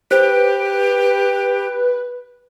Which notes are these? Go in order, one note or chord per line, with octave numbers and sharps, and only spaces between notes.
G4 B4 C5